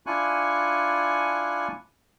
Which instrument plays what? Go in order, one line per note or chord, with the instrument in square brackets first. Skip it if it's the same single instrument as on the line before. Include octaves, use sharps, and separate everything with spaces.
[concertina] D4 E4 F4 G#5 C#6 F#6